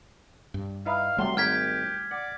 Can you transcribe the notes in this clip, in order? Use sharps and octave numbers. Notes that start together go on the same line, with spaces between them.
G2
D#4 E4 B4 F5
C3 F#3 G3 A3 C6
G#1 G4 A#4 F6 G#6 B6
D5 F#5